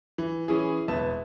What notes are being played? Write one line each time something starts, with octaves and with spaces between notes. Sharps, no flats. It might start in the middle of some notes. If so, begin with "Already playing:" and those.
E3
E3 C#4 E4 G#4
E1 B3 E5 A5